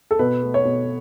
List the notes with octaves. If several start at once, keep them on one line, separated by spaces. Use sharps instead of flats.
A4
B2 B4
A3
C#5
B2